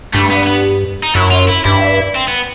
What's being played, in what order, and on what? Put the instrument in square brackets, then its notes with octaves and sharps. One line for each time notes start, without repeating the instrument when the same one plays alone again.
[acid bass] G2 [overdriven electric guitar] A3
[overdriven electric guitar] B3
B3
D#4
[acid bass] F#2 [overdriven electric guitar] E4
[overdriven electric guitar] F4
E4
[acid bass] G2 [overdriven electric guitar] E4
[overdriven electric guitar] C4
B3